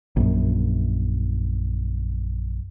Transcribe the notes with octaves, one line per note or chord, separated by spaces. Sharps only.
A#1 F#2